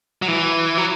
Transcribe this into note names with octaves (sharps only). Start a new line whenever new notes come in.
F#3
E3
F#3